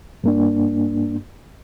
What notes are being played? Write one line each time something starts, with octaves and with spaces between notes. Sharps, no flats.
G2 A#3 D4